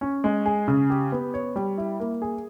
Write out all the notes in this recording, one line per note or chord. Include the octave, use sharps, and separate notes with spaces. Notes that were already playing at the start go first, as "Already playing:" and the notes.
C#4
G#3
G#4
C#3
G4
B3
C#5
G3
E4
A#3
G#4